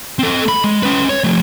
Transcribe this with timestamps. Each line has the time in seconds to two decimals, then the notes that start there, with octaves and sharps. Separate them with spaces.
0.19 C4 A4
0.48 B5
0.64 G#3
0.83 C#4 B4
1.10 C#5
1.24 F3 A3